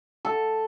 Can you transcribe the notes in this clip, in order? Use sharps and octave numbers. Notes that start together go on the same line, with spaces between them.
A4